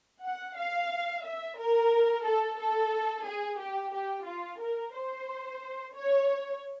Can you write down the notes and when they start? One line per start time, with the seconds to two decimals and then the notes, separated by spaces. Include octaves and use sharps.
0.24 F#5
0.57 F5
1.24 E5
1.58 A#4
2.26 A4
2.59 A4
3.26 G#4
3.60 G4
3.93 G4
4.26 F4
4.60 A#4
4.94 C5
5.95 C#5